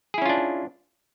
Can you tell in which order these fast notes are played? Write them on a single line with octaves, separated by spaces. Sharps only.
G#4 E4 C#4 F4 D4